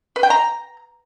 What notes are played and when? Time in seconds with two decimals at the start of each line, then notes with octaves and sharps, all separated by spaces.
0.16 B4
0.23 G5
0.30 A#5